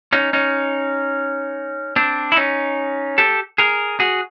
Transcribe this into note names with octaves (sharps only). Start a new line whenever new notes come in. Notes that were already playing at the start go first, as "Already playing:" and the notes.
C#4 D#4
C#4 D#4
C4 D4
E4
C#4 D#4
G4 A4
G#4 A#4
F#4 G#4